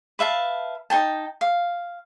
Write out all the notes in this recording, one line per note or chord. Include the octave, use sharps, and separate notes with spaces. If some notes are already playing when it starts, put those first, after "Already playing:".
B4 E5 F5 A5
D#4 G#4 G5 A5
F5